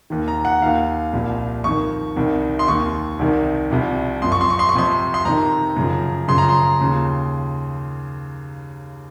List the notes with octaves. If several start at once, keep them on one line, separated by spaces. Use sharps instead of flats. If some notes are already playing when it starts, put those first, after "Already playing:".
D#2 D#3
A#5
F#5
D#2 D#3 F5
C2 A#2 F3
F2 D#3 C#6
C2 C3 D#3
C6
D#2 D#3 C#6
C2 C3 D#3
C2 C3 F3
F#2 F3 C6
C#6
C6
C#6
C6
C#6
F2 C3 F3 C6
C6
F2 C3 D#3 A#5
F#2 C#3 F3
F#2 C#3 F3 C6
A#5
C6
D#2 C#3 F3